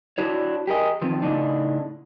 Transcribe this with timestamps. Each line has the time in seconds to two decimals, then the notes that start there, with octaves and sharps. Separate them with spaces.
0.18 D4 E4 F#4 C#5
0.67 G4 G#4 A#4 D#5
1.01 D#3 F3 B3 C4
1.22 A2 C#3 D4 D#4